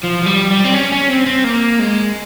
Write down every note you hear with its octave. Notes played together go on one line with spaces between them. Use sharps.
F3
F3
G3
G3
C4
C#4
C#4
C4
C4
A#3
G#3